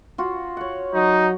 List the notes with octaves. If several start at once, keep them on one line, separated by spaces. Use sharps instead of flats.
F4 F#4
C#5 F#5
F#3 D#4